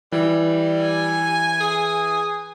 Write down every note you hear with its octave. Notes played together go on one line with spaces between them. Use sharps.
E3 G3
G#5
G#4